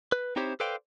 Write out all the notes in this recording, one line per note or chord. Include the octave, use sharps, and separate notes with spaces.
B4
C4 D#4 E4 G4 C5 C#5
A4 B4 C5 D5 F5 G5